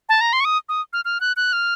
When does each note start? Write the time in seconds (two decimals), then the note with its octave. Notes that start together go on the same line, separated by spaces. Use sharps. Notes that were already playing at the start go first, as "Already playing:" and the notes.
0.09 A5
0.21 A#5
0.33 C6
0.40 C#6
0.45 D#6
0.69 D#6
0.93 F6
1.05 F6
1.21 F#6
1.37 F#6
1.53 F6